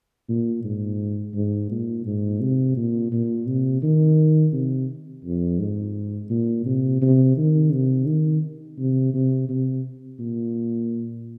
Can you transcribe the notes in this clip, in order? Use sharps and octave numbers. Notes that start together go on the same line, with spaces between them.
A#2
G#2
G#2
A#2
G#2
C3
A#2
A#2
C3
D#3
C3
F2
G#2
A#2
C3
C3
D#3
C3
D#3
C3
C3
C3
A#2